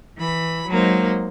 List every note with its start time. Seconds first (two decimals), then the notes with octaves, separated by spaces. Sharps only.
0.18 E3 B5
0.70 F#3 G#3 A#3 D#4 C5